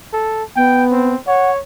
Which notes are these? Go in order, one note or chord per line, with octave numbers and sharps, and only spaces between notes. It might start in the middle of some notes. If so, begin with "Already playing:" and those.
A4
B3 G5
C4
C#5 F#5